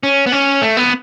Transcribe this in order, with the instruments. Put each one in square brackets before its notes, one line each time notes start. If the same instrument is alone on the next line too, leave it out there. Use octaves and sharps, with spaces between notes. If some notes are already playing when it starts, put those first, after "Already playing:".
[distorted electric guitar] C#4
B3
C#4
A3
B3